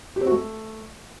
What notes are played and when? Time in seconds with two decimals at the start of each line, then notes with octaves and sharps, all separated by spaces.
0.16 G4
0.21 C4
0.26 F#4
0.32 A3